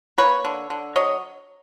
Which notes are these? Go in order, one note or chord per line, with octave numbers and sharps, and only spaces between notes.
A#3 B4 C#5
D3
D3
F#3 C#5 D#5